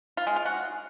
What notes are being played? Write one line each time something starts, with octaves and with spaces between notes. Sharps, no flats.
F4
G#3
F4
F#4